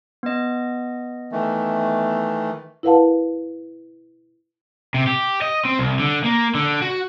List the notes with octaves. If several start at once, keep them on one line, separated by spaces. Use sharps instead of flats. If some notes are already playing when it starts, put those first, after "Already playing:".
B3 D#5
D#3 E3 A3
E4 A#4 B4 F5 F#5 A5
C3
G4
D#5
C4
C2
D3
A#3
D3
F#4